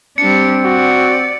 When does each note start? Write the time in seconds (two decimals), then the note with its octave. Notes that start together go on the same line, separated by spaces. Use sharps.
0.18 G3 C4 D4 C#7
0.64 F#4 D5